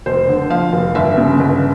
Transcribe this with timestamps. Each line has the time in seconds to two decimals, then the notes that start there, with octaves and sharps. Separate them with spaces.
0.06 F1 C5
0.28 D3
0.50 F3 F5
0.73 F1
0.95 G1 E5
1.18 C#3
1.39 G1